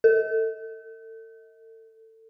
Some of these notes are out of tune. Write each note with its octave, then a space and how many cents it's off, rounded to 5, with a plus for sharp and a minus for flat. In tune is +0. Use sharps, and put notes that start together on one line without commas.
A4 +30